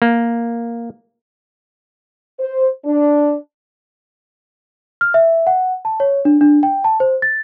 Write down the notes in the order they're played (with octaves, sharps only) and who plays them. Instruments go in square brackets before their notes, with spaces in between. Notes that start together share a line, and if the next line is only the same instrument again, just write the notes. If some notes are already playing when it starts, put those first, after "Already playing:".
[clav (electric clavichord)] A#3
[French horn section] C5
D4
[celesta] F6
E5
F#5
A5
C#5
D4
D4
G5
A5
C5
A6